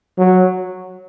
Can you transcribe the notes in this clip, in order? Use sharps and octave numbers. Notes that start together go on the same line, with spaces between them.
F#3